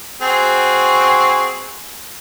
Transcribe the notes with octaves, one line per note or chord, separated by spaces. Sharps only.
C4 F#4 G#4